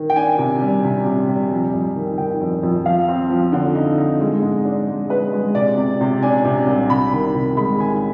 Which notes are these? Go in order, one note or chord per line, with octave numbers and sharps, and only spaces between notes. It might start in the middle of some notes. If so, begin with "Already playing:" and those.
Already playing: D#3
G5
D4 G#5
C3
G3
C3
C3
G3
F2
F2
D#3
D#3 G5
F2
F2
F3 F5
C4
F3
D3
D#4
D#4
G#3
G#2
D4
G#3
G#3 B4
G#3
C3 D5
C3
C3
D4 G#5
C3
C2
C3 B5
D#3
C3
G#3 B5
D#3 G#5